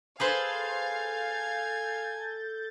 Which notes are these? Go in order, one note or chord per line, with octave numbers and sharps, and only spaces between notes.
G#4 A4 B4 C5 F5 G#5 G6 A6